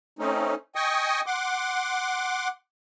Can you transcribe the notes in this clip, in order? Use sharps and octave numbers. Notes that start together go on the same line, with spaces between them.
A3 C4 C#4 D#4
D#5 G5 G#5 C#6 D#6
F#5 C6 D6